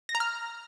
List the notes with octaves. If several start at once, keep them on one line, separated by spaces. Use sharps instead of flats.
A#6
A#5
F6